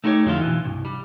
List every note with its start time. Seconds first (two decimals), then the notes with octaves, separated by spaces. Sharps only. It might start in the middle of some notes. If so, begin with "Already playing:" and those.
0.04 A3 D#4 E4 G4 C#5
0.25 F2 D3 E4 F4
0.41 B1 E3
0.64 C2 G2
0.85 G3